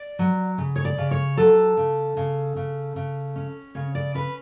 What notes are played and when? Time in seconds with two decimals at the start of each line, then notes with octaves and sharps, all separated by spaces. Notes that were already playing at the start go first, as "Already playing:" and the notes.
Already playing: D5
0.19 F#3
0.58 C#3
0.76 C#5
0.85 D5
0.98 C#3
1.11 C#5
1.37 F#3 A4
1.77 C#3
2.17 C#3
2.56 C#3
2.96 C#3
3.36 C#4
3.75 C#3 C#5
3.95 D5
4.15 C#4 B4